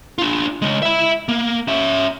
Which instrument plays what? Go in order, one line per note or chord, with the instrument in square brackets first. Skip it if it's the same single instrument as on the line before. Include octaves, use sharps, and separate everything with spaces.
[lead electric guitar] D4 F4
C#3 G#3
E5 B5
A#3
C#4 E5